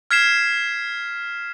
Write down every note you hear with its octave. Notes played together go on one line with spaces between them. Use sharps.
F6 G#6 B6 C7 E7